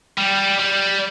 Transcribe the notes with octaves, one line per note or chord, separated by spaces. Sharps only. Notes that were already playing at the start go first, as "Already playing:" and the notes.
G3
G3